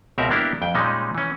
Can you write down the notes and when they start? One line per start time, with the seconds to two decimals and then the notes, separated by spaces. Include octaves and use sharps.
0.18 C#2 B2 C4 F#4 A#4 E5
0.30 A#3 B3 D4 E4 G4 A#4
0.62 F2 G5
0.75 A#2 G3 G#3 C#4 D#4
1.15 E3 C#4